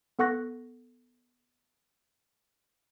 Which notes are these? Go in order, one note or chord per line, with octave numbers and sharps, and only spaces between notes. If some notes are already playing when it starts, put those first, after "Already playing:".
B3 A4 F#5 C#6 F#6 A#6